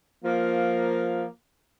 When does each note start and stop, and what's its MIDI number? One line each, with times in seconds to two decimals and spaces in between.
0.25 1.25 53
0.25 1.25 58